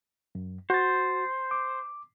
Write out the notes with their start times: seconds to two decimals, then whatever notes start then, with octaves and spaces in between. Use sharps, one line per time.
0.35 F#2
0.70 F#4 C5 A6
1.51 D6